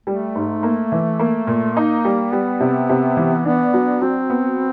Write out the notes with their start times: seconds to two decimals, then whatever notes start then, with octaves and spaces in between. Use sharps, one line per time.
0.07 G3 A3
0.35 G#2
0.63 A#3
0.92 E3
1.19 A#3
1.47 A#2
1.76 A#3 D#4
2.05 G3
2.33 G3 B3
2.60 C3
2.89 C3
3.17 E3
3.45 B3 D4
3.74 F#3
4.01 F#3 C4
4.30 B3